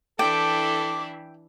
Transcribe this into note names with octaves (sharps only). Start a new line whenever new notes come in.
E3 D4 E4 A4 G5 D6